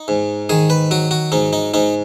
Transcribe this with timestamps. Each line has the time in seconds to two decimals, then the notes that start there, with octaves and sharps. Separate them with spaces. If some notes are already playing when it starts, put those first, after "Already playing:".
Already playing: D#4
0.08 G#2
0.49 D#3 G#4
0.70 B4
0.91 F#3 F#4
1.11 F#4
1.32 G#2 D#4
1.53 D#4
1.74 G#2 D#4